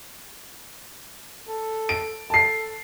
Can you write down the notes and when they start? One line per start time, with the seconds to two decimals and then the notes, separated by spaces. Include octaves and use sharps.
1.48 A4
1.89 D7
2.30 A4 A5 C7